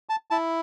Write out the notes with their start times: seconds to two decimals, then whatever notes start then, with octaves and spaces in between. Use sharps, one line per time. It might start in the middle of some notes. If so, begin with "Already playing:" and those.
0.09 A5
0.31 E4 A5